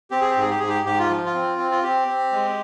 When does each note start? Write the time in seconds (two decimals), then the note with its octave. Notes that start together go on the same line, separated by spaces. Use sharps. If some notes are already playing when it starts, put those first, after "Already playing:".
0.11 C4 G4
0.21 G#4
0.30 G4
0.36 G#2 G#4
0.50 G4
0.59 G#2 G#4
0.69 G4
0.85 G#2 G4
0.99 F4
1.10 F3
1.25 F4
1.34 C4
1.58 C4
1.71 F4
1.83 C4 G4
2.08 C4
2.32 G#3